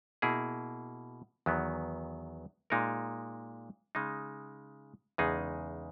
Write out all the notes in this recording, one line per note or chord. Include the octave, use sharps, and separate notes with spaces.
B2 A#3 E4 G#4
E2 D#3 F#3 B3
A#2 G#3 D#4 A#4
C#3 G#3 D#4
E2 C#3 G#3 D#4 G#4